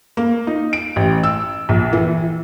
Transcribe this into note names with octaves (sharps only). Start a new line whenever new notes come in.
A#3
D#4
D7
A1
E6
A#1
E3